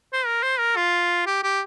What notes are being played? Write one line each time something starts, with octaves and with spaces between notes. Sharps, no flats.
C5
A#4
C5
A#4
F4
G4
G4